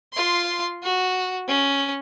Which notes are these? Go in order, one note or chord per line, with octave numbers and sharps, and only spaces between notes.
F4 C6
F#4
C#4